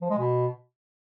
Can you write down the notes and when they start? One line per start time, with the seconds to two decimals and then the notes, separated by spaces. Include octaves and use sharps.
0.02 F3
0.10 G#3
0.19 B2